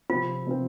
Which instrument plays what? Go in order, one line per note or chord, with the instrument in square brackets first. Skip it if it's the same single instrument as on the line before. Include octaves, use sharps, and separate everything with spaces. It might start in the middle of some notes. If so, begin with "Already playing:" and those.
[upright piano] C3 F3 C4 [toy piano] F4
[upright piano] C3 F3 C4